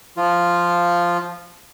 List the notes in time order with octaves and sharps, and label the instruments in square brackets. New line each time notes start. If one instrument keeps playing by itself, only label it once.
[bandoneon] F3 F4